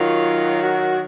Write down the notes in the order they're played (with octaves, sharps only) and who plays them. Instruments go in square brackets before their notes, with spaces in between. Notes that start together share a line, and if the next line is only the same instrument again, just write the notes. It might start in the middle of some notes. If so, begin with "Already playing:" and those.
Already playing: [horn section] D#3 F#3 [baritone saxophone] F4
[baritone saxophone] F#4